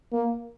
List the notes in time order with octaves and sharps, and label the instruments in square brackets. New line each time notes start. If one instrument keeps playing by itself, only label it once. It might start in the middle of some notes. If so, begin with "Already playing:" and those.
[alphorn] A#3